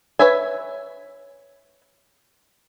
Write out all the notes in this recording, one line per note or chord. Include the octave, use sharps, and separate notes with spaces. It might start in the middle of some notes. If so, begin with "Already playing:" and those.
B4 C#5 E5 G#5